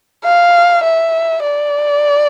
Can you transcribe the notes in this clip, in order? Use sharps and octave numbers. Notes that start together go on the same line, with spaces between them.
F5
E5
D5